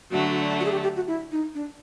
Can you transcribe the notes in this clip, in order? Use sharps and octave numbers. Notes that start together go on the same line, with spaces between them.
D3 F#3 A3 D4 F#4
F#4
G#4
G4
G4
F#4
E4
D#4
D4